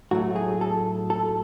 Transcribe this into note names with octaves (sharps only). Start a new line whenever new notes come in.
A2 F#3 A3 F#4
G#4
A4
A4